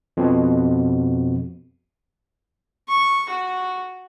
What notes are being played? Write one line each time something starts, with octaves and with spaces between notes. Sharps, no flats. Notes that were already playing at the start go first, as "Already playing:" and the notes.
F2 B2
C#6
F#4